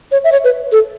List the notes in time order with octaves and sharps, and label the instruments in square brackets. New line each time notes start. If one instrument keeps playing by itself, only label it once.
[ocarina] C#5
E5
C#5
B4
A4